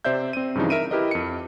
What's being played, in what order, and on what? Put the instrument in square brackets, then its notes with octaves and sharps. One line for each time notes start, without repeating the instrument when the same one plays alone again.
[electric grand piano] C3 C5 D5 E5 G6
C4 D#7
G2 C#3 E3 F3 D#4
A#4 E5 D7 D#7
E4 G4 A#4 B4 D#5
F2 C#7